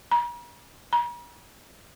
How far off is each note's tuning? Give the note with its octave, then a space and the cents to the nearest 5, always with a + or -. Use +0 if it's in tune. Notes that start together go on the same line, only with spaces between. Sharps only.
A#5 +45
A#5 +45